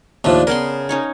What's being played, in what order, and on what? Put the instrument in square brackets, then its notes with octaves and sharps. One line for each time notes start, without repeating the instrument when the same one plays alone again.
[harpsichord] D#2 A2 F3 [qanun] D4
[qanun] C#3 B3 C6 [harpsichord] A#4
[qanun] C#4 D#4 C#5